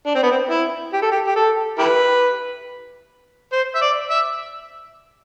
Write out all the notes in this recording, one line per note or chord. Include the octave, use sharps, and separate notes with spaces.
D4
C4
B3
C4
E4
G4
A4
G4
G4
A4
E4 G4 B4
C5
E5
D5
E5